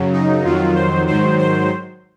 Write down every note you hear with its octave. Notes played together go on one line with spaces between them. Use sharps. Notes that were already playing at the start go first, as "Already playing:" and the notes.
Already playing: F#2 C#3 F#3
D#4
F2 D#3 F#3 F4
C5
G#2 D#3 F#3 C5
C5